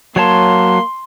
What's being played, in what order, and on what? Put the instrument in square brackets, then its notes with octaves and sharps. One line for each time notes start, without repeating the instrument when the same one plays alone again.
[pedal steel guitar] F#3 C#5 A5 [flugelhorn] A#3 [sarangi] C6